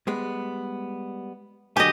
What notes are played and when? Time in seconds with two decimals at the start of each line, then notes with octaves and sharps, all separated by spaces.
0.07 G3 G#3 B3
1.77 D3 F#3 G4 D#5 G#5